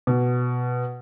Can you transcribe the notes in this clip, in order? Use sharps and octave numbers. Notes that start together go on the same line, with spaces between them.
B2